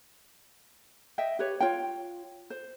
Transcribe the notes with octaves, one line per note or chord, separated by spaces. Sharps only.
D#5 E5 G5
G4 B4 C#5
F4 C#5 G5
C5